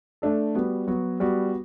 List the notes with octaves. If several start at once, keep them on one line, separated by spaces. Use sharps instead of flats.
A3 D4 A4
G3 B3 F#4
F#3 B3 F#4
G3 B3 F#4